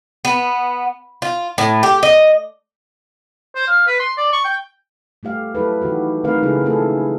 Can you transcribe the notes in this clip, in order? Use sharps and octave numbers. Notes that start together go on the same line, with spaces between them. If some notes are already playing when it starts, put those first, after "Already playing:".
B3
F4
A2
G4
D#5
C5
F5
B4
C6
D5
C#6
G5
G3 A3 G4 F5
F#3 E4 A4 B4
D#3 E3 F#4 G4
D#3 A3 C4 A#4 B4 F5
C#3 G#3 E4 G#4
A3 C4 C#4 F4 G#4 A4